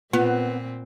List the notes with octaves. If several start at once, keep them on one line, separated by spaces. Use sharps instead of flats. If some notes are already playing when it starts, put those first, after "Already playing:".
A#2 B3 C4 F4